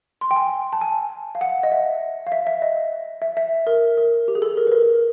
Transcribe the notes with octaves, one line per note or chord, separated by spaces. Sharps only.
C6
G5
G#5
A5
G#5
F5
F#5
D#5
E5
F5
E5
E5
D#5
E5
E5
A#4
A#4
G4
G#4
A4
A#4
B4
A#4